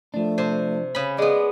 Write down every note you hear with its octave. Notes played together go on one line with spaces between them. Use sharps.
F3 A3 D4
C3 C5
C#3 B5
G#3 B3 G#4 D5 D#5